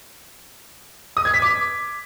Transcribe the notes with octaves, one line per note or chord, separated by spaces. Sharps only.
D#6
G#6
B6
D6